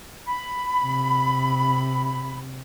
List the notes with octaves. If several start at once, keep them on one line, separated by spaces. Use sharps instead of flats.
B5
C3